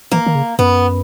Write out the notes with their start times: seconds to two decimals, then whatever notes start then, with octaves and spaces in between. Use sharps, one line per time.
0.11 E3 A#3
0.26 D#3
0.35 C#3
0.59 F#2 B3